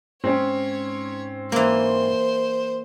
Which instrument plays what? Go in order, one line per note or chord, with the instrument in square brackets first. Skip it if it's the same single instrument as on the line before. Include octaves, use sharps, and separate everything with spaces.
[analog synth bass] G#2 [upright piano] C4 C#4 [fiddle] C#5
[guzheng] E3 A#3 [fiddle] C5